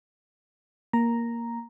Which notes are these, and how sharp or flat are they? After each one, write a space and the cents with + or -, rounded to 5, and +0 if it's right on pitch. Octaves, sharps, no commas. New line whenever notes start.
A#3 +5 A#5 +0